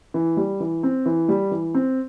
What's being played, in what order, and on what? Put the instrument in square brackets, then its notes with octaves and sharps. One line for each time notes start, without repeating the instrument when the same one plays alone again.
[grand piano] E3
G3
E3
C4
E3
G3
E3
C4